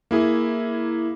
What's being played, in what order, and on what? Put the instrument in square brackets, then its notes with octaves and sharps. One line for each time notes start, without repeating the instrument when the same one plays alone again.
[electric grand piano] A#3 E4 G#4